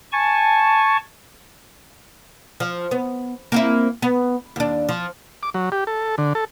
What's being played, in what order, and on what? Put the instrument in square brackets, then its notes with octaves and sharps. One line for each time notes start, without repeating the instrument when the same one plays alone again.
[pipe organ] G#5 A5 C#6
[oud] F3
B3
A#3 C4 E4
B3
D#2 D4
F3
[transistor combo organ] D6
F#3
G4
A4
D3
A4